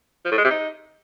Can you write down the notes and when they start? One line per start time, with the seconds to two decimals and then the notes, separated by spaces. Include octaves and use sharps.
0.25 F3
0.31 A2
0.38 G#3
0.44 C3
0.51 D#4